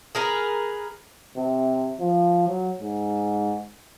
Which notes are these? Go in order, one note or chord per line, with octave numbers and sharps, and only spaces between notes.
G#4 A#4 B4
C3
F3
F#3
G#2